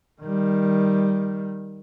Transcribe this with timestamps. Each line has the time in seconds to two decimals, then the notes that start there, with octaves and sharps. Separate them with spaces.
0.21 D#3 G3